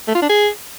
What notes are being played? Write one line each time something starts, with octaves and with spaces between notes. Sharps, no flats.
A3
F4
D4
G#4